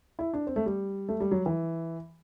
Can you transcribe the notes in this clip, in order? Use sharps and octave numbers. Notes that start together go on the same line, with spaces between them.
E4
D4
C4
A3
G3
A3
G3
F#3
E3